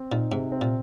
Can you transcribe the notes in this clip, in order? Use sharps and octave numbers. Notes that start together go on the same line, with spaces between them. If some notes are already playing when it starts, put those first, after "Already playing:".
Already playing: C4
A#2 D#4
G#2 C3
C4
A#2